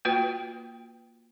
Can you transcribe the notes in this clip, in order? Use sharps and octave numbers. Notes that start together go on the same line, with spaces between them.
A#3 F4 F#4 B4 G5